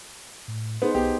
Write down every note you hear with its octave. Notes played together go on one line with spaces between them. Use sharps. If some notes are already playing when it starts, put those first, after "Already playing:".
A2
B3 D#4 G#4 C5
B1 B3 G4